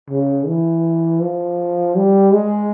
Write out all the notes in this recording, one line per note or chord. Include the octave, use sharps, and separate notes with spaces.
C#3
E3
F3
G3
G#3